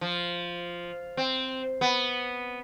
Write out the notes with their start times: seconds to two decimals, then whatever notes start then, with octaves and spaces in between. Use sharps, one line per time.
0.01 F3
1.17 C4
1.81 B3